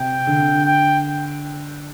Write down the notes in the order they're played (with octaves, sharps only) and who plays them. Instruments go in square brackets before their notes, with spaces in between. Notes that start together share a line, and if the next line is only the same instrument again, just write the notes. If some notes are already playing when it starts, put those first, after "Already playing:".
Already playing: [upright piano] C3 [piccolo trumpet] G5
[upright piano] D3
[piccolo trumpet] G5